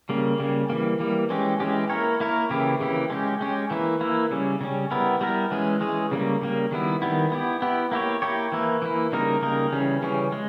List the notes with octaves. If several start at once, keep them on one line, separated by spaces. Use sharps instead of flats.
C#3 G3 A#3
C#3 G3 A#3
E3 G3 A#3
E3 G3 A#3
E3 G#3 C#4 G4
E3 G#3 C#4 G4
A#3 E4 A#4 C#5
A#3 E4 A#4 C#5
C#3 E3 A#3 E4 G4
C#3 E3 A#3 E4 G4
G#3 C#4 G4
G#3 C#4 G4
E3 A#3 E4
E3 A#3 E4
C#3 G3 C#4
C#3 G3 C#4
G3 B3 E4 A#4
G3 B3 E4 A#4
E3 G#3 C#4 G#4
E3 G#3 C#4 G#4
C#3 G3 A#3
C#3 G3 A#3
D#3 G3 B3 E4
D#3 G3 B3 E4
B3 E4 G4
B3 E4 G4
A#3 E4 G4 C#5
A#3 E4 G4 C#5
E3 A#3 E4
E3 A#3 E4
C#3 G3 A#3 D#4 A#4
C#3 G3 A#3 D#4 A#4
C#3 E3 G3 C#4
C#3 E3 G3 C#4
G#3